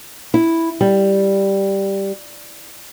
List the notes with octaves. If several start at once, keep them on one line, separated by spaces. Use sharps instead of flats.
E4
G3